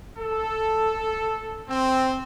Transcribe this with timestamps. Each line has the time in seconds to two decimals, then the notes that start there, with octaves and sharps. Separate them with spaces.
0.18 A4
1.69 C4